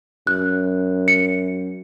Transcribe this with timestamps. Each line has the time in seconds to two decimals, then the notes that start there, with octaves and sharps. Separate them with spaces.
0.27 F#2 F#6
1.08 C#7